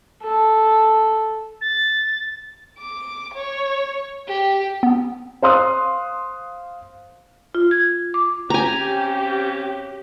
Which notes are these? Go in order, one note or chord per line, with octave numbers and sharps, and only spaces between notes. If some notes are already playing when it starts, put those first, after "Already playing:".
A4
A6
D6
C#5
G4
B3
C5 F5 C6 D#6 F#6
F4
G#6
D6
C#3 C4 C#4 G4 G#5 A#5